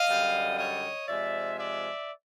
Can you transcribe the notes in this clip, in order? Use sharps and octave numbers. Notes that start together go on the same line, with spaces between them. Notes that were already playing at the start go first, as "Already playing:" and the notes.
Already playing: D#5 F5
F#2 D3 G3
C#5 D#5
C3 F3 G#3 D5 E5
D5 E5